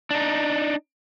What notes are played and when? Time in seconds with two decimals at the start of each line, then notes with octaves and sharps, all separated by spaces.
0.11 D4 D#4